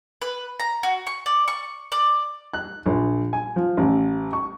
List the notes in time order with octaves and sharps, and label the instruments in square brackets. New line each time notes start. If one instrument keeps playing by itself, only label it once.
[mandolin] B4
A#5
F#4
C#6
D5
C#6
D5
[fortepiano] F#6
A#1
G#5
F3
A1
C#6